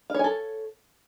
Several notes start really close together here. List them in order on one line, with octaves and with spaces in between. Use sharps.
F5 C#5 G#5 A4